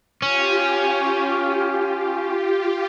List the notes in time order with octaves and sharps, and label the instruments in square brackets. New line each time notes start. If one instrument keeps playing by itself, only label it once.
[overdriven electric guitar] C#4 [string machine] F4 G4